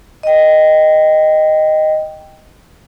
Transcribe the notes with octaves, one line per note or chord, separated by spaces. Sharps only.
D#5 G5